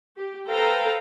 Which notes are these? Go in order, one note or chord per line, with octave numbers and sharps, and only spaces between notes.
G4
A4 B4 C5 F5 G5 A#5